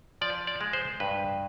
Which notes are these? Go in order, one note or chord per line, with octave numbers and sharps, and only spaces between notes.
F3 D5
D5
G#3
C5
G2 B4